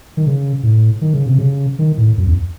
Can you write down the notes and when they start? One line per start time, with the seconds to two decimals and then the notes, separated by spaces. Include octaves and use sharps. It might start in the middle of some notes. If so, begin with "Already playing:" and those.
0.17 D#3
0.26 C#3
0.63 A2
1.02 D#3
1.14 C#3
1.27 C3
1.38 C#3
1.79 D#3
1.98 A2
2.17 F#2
2.27 E2